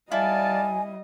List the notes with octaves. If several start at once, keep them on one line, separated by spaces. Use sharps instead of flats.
G3 E4 D5 D#5 F5 G#5 A5